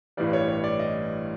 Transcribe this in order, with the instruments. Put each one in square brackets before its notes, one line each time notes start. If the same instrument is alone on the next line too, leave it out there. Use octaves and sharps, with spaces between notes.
[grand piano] A1 G2 E3 G3 D5
C#5
C#5
D5
D#5